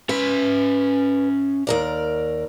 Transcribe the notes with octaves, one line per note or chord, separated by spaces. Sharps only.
C#4 B4 E5
D#2 A#4 D5